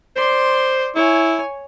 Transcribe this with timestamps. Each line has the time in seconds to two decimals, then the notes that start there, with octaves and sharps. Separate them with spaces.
0.16 C5 D5 C6
0.96 E4 C#5 G#5